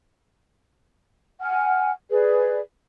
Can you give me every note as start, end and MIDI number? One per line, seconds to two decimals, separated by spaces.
1.42 1.91 78
1.42 1.91 80
1.42 1.91 89
2.10 2.59 68
2.10 2.59 71
2.10 2.59 74